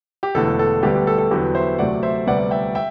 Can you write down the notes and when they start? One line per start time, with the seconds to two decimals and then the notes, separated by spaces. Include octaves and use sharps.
0.23 G4
0.35 E1 E2 D3 A3 A4
0.59 A4
0.83 D2 D3 G3 B3 G4
0.95 G4
1.07 A4
1.19 A4
1.31 E2 D3 F#3 B3 G4
1.55 C5 E5
1.78 D2 C3 F#3 A3 D5 F#5
2.03 C5 E5
2.26 D2 C3 G3 B3 D5 F#5
2.51 E5 G5
2.75 E5 G5